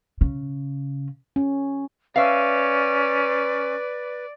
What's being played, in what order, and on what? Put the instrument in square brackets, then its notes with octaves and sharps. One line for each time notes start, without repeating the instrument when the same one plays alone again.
[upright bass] C#3
[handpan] C#4
[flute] C#4 [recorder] B4 [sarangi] D5 [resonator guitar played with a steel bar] E5 F5